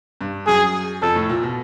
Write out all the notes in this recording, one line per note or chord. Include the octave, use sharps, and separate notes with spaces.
G2
F#2 G#4
F2 A4
A2
A#2
B2